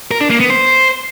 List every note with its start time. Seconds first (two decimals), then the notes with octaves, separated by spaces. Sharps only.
0.11 A#4
0.21 D4
0.31 A#3
0.40 B3
0.50 C5